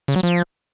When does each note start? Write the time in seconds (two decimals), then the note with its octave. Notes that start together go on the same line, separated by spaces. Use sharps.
0.08 C#3
0.16 F#3
0.23 F3